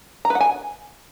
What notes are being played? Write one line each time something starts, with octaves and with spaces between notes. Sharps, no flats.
A#5
B4
F#5
G#5